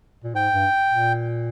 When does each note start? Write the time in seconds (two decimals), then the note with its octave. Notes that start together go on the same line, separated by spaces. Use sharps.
0.24 A#2
0.35 G#2 G5
0.54 G2
0.90 A#2